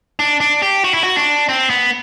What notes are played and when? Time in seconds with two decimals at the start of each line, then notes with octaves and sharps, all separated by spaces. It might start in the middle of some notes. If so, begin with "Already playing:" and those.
0.19 D4
0.40 D4
0.62 G4
0.84 F#4
0.94 E4
1.03 F#4
1.16 D4
1.49 C4
1.70 B3